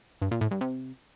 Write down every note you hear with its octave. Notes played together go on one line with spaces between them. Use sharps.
G2
A#2
A2
G2
C3